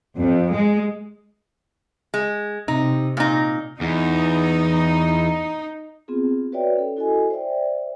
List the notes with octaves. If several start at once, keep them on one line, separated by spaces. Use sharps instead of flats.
F2
G#3
G#3
C3 D#4
A#2 D#4
E2 D#4
B3 C4 F4 G#4
F#4 B4 C#5 D5 E5 G5
C#4 A4
E4 F#4 A4 D#5 G#5
C5 D5 E5 G5